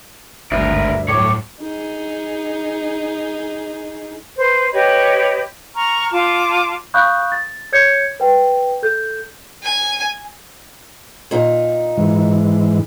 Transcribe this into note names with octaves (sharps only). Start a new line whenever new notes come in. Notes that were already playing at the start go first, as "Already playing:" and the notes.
G#1 D2 G2 A3 A#4 B4 E5
A2 F#3 C#5 D6
D#4 G#4
B4 C5
G4 B4 C#5 D#5
A#5 C#6 F6
F4 A5 D6
F5 B5 C#6 D#6 F#6 G6
A6
C#5 G6 G#6 C#7
B4 G5
A4 G6
G#5
A#2 D#4
G#2 E3